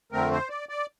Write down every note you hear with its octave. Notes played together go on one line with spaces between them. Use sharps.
F2 D3 A3 C4 A#4
C5
D5
D5